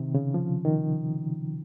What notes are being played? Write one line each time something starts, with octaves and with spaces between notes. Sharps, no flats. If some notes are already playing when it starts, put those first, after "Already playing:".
Already playing: C3 D#3
C#3
F3
D#3